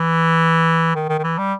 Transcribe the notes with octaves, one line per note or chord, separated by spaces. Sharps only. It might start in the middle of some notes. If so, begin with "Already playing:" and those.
Already playing: E3
D#3
D#3
D#3
E3
G3